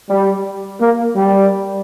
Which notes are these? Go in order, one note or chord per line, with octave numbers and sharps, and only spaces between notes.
G3
A#3
G3